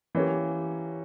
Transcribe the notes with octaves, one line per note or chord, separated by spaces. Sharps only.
E3 A#3 C#4 G4